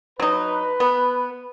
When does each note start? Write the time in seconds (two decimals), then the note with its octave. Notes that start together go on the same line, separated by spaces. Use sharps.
0.20 F#3 D#4 B4
0.80 B3